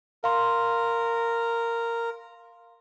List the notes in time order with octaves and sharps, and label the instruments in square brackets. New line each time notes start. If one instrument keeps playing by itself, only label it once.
[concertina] A#4 [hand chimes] F5 C6